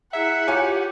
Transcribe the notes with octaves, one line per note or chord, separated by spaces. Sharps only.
E4 G#4 E5 F#5 A#5
F4 G4 C#5 G#5